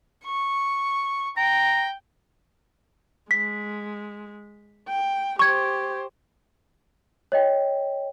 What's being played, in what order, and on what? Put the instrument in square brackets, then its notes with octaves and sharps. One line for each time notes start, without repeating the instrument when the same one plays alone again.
[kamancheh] C#6
[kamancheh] G5 [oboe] A#5
[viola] G#3 [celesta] B6
[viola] G5
[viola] G4 C5 [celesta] C#6 G#6
[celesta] C#5 D#5 G5